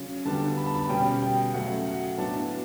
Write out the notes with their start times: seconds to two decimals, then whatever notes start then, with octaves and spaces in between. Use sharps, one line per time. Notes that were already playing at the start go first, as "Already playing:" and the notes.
Already playing: C#3 F#3 C#4
0.25 D3 G3 B3 D4 A5
0.57 B5
0.66 A5
0.75 B5
0.89 B2 G3 C#4 G5
1.22 G5
1.54 C#3 F#3 A3 F#5
1.86 F#5
2.18 A2 F#3 B3 D4 A5